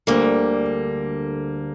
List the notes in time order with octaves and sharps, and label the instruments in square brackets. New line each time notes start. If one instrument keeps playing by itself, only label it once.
[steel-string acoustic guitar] D2 D3 G3 [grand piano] A#3